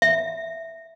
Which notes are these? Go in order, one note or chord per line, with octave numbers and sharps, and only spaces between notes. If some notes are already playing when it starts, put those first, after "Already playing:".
E5